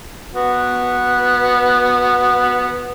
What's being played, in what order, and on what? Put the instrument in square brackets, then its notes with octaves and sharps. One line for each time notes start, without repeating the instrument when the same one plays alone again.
[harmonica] B3 F#4